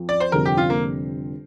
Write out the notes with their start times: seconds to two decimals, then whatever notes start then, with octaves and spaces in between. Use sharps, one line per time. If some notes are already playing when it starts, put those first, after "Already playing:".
Already playing: F2 F3 C4
0.09 D5
0.20 C5
0.32 F1 F2 D3 G3 C4 A#4
0.45 G4
0.57 F4
0.70 A#3